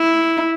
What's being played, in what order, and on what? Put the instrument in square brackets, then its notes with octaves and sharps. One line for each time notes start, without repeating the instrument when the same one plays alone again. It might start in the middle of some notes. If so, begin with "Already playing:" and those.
Already playing: [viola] E4